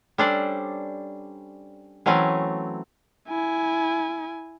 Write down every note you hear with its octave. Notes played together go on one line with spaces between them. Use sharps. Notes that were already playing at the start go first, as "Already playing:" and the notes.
G3 C#4 D4 A4 C5 D5
E3 F#3 A3 C4 C#4
E4 G#5